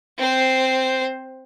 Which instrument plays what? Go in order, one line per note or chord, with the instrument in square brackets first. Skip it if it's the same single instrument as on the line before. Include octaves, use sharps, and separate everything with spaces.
[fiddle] C4 C5